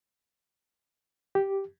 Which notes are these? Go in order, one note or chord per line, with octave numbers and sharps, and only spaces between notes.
G4